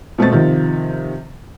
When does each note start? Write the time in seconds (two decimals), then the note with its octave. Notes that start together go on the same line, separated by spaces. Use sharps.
0.18 B2 A3 C4 A6
0.32 C3 D#3 F3